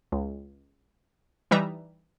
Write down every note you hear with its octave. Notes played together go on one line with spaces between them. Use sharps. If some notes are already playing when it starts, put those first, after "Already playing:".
C#2
E3 G3 D#4 B4 E5 A#5